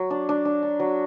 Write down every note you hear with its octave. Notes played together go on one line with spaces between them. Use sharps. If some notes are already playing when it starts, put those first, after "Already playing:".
Already playing: F#3
D4
D4
D4
D4
F#3